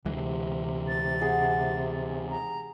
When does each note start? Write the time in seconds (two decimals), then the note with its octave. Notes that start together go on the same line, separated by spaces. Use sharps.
0.05 D2 C3 E3 G#3
0.88 A6
1.21 G#4 F#5
2.30 A#5